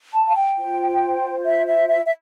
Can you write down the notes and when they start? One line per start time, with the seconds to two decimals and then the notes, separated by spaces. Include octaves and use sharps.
0.14 A5
0.28 F5
0.36 G5
0.58 F4 C5
1.45 E5
1.67 E5
1.89 E5
2.07 E5